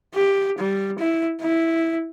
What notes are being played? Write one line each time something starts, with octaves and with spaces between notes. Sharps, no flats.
G4
G3
E4
E4